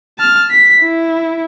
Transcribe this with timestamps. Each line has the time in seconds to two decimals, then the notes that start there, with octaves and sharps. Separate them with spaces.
0.19 A5 F6
0.51 B6
0.82 E4